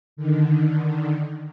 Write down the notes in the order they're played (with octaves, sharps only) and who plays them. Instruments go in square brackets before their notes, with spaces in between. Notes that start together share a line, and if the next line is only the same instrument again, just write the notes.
[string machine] D3 D#3